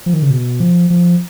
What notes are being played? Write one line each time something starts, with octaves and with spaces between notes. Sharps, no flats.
F3
D#3
C#3
B2
F3
F3